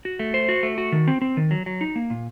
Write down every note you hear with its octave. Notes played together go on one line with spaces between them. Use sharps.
F#4
A3
C5
F#4
A3
F#4
D#3
C4
C4
D#3
F#3
F#3
D#4
A#3
A#2